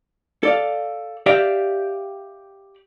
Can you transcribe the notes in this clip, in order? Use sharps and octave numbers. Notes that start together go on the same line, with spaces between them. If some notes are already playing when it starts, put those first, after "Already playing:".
A4 D5 F5
G4 D5 E5 F5 G5